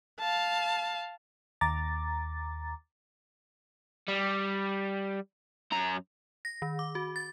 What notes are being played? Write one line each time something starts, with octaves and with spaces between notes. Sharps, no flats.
F5 A5
D#2 A#5 D6 A6
G3
F#2 A#5
A#6
D#3
D6
F#4
A6